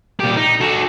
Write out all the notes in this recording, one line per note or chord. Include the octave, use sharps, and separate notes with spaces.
A#2 G4
D#4
F#4 A4